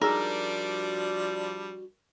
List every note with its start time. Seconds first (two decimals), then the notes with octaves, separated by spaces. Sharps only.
0.01 F3 G3 D4 D#4 F#4 G#4 A#4 E6